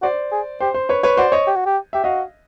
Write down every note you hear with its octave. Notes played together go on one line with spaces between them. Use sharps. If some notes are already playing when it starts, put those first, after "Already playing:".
F#4 C5 D5
G#4
G4 C5
C5
B4 C#5
B4 C#5
F#4 C5 D5
C#5 D#5
G4
F#4
G4
G4 E5
F#4 D#5 F5